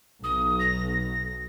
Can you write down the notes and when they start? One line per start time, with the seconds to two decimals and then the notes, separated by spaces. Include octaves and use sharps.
0.24 B1 D#6
0.60 A#6